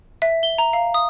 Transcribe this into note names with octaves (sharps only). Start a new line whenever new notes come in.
E5
G7
A#5
F5
D#6